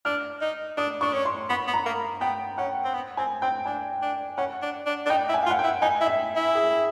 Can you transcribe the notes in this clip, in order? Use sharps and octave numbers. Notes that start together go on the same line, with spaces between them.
D4 F6
D#4
D4 D#6
D4 C#6
C#4
C6
B3 B5
B3
A#5
A#3
B3 G5
C#4 F#5
C4
B3
C4 G#5
C4 G5
D4 G#5
D4
C#4 F#5
D4
D4
D4
D#4 G5
E4
G#5
F5
F4
F#5
E4 G5
D#4 G#5
E4
E5
E4
G#4